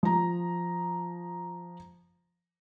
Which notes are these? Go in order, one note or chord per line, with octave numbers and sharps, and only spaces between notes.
F3 A#5